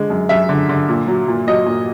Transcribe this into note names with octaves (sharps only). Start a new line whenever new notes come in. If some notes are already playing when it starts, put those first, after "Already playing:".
Already playing: D3 G#3
F#2
F#2 E5
D3
D3
A#2
F#3
A#2
F#3 D#5
A#2